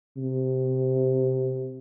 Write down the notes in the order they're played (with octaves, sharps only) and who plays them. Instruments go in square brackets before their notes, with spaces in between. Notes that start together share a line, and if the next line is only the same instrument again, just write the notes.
[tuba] C3